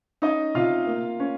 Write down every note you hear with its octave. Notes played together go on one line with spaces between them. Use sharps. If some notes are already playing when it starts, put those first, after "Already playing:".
C#4 D#4 D#5
C3 F4 F5
A#3
C#4